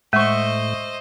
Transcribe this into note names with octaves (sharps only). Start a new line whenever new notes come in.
A2 G#3 C5 D#5 E5 C#6